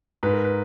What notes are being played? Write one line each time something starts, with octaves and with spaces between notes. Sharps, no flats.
G#2 B4
A#4
B4